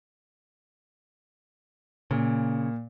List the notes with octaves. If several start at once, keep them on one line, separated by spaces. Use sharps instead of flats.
A#2 C#3